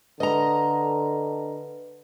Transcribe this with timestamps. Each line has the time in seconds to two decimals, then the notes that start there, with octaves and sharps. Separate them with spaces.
0.20 D3 B4 D#5 A#5